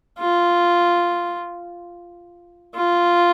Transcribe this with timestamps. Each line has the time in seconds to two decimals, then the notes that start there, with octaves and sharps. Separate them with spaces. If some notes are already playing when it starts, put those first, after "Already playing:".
0.19 F4
2.75 F4